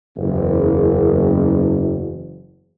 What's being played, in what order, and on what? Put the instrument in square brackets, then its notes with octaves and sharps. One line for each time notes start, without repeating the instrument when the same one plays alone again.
[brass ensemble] F#1 E2